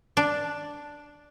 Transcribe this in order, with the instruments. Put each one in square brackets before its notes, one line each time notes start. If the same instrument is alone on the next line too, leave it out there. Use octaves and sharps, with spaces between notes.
[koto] D4